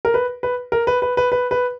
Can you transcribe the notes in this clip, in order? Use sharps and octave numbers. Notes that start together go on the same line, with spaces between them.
A#4
B4
B4
A#4
B4
B4
B4
B4
B4